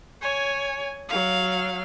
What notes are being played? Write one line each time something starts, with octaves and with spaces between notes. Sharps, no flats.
C#5 G#5
F#3 F5